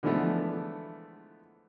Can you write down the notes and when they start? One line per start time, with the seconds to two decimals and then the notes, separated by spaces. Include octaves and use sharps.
0.03 D3 E3 F3 G#3 A3 B3